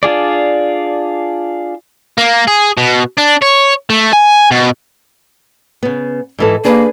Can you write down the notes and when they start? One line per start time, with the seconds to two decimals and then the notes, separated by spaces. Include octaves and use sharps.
0.03 D4 F4 G#4 D5
2.18 A#3
2.48 G#4
2.78 B2
3.18 D4
3.42 C#5
3.90 A3
4.13 G#5
4.51 B2
5.83 C#3 B3
6.39 G#2 E3 A4
6.65 A#3 D4 G#4 B4